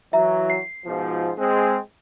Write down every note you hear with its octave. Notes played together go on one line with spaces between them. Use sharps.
E3 F#3 E5 A#5
C7
G#2 B2 F3
G#3 C4